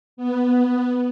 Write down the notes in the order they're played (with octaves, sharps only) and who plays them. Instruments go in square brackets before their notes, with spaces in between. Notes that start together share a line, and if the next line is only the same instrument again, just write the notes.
[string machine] B3